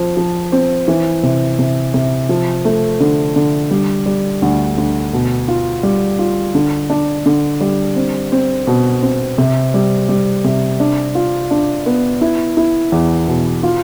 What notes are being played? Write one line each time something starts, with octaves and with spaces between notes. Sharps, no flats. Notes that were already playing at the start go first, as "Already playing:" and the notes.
Already playing: F3 C4
F3
C4
E3
C3
C3
C3
F3
A3
D3
D3
G3
G3
D2
D2
B2
F4
G3
F4
D3
D4
D3
G3
C4
C4
B2
C4
C3
G3
G3
C3
D4
F4
D4
B3
E4
E4
E2
B2
F4